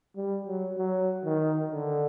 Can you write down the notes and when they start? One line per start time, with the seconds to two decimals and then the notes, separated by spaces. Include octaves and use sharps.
0.16 G3
0.47 F#3
0.78 F#3
1.25 D#3
1.72 D3